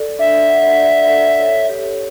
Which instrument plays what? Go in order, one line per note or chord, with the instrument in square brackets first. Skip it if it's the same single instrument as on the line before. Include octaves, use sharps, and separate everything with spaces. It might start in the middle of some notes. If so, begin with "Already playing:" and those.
Already playing: [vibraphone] A4 D5
[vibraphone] D4 [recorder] E5
[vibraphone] F#5
D5
A4
C#5
G4